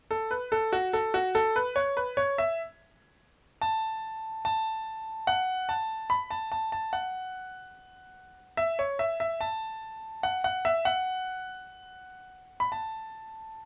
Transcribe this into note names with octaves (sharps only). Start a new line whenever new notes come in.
A4
B4
A4
F#4
A4
F#4
A4
B4
C#5
B4
C#5
E5
A5
A5
F#5
A5
B5
A5
A5
A5
F#5
E5
C#5
E5
E5
A5
F#5
F#5
E5
F#5
B5
A5